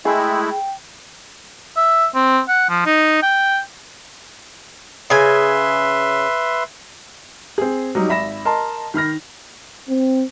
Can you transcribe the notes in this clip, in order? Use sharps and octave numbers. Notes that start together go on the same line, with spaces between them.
G#3 A3 E4 G#4 G5
G5
E5
C4
F#5
F3
D#4
G5
C#3 B4 E5 G#5 C6
C4 G#4
F#3 G3 D#4
G#1 E5 B5 A#6 E7
A#4 D#5 A5 C6
D#3 B5 F6 A#6
C4